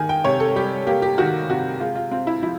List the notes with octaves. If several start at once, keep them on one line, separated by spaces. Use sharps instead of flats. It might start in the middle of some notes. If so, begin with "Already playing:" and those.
Already playing: D#3 A#3 G#5
G5
C3 C#5
A4
G3 G4
A#3 G4
G4
D#3 F#4
C3 F#4
G#3 F4
F4
C4 F4
E4
F3 E4